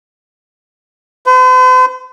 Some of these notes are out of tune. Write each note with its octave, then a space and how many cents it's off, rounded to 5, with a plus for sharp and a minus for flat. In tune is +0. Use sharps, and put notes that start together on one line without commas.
C5 -45